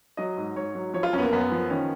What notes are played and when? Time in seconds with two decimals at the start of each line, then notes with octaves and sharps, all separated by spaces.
0.17 F#3 D#5
0.37 G#2
0.56 G#2 C#5
0.75 F#3
0.94 F3 C#5
1.03 F4
1.13 F#2 C#4
1.18 B3
1.23 A#3
1.33 F#2 B3
1.52 F3
1.70 D#3 C#4